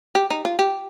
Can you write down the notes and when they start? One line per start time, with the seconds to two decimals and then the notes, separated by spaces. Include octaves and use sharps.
0.15 G4
0.30 D#4
0.45 F4
0.59 G4